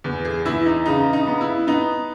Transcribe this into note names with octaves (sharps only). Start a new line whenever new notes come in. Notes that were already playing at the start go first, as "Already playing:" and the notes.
E2
G#4
E2 E4
D#4
C#3 D#4
D#4
B3
E4
B3 D#4